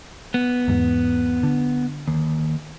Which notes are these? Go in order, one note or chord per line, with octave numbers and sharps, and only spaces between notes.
B3
E2 G#2
D3
D#2